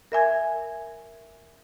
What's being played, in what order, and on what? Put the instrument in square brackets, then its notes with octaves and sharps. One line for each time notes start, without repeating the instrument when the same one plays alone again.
[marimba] A#4 E5 G#5 G#6